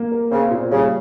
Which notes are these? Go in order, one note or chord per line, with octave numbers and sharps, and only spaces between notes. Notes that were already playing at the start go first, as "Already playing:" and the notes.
Already playing: A#3
A#4
C#3 C4
A#2
C#3 G3